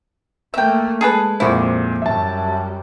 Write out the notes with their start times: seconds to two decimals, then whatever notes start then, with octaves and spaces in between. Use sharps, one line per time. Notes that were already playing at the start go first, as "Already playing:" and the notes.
0.54 A3 A#3 E5 G5
1.01 G#3 G#4 A4 B4
1.40 F2 A#2 E4 F#4 C5
2.02 F#2 G3 E5 A5